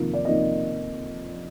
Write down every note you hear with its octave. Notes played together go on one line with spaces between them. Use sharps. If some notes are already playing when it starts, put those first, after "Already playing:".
Already playing: F2 C3 D#3 A#3
D5
F2 C3 D#3 A#3 D#5